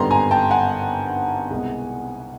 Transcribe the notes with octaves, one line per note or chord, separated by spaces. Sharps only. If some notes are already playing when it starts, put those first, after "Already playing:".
Already playing: G#1 G2 D3 G3 B3 A#5 C6
G#5 A#5
G5 A5
F#5 G#5
C2 B2 G#3